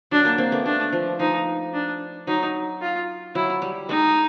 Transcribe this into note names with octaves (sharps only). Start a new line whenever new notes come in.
F#3 D4
A#3
A#3 C4
A3 B3
A3 D4
F3
F3 D#4
D4
F#3 D#4
F4
F#3 E4
G3
G#3 D#4